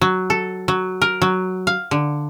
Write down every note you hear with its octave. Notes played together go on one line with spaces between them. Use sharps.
F#3
A4
F#3
A#4
F#3
F5
D3